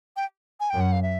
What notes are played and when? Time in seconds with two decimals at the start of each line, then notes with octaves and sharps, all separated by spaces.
0.17 G5
0.60 G#5
0.70 F#2 G5
0.81 F#5
0.92 F5
1.02 E5